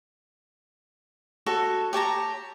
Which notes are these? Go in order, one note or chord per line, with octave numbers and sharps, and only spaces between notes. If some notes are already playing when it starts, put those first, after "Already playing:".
F#4 A4 C#5
G4 C#5 A5 A#5